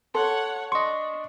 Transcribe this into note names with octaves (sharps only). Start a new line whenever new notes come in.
A4 C#5 F#5 C6
D4 D#5 C6 C#6